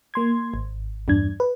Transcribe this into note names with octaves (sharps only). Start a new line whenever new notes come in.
A#3 C6 G#6
G#1
E2 G2 D4 G#6
B4